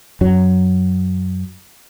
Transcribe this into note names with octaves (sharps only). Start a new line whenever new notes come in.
F#2 F#3